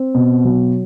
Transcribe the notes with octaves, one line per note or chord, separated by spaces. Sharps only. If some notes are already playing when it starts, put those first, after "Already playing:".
Already playing: C4
B2
F#3